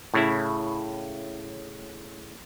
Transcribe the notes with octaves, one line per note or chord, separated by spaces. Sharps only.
A2 C#3 E4